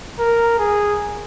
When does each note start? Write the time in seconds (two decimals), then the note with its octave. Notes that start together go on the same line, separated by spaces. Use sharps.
0.19 A#4
0.59 G#4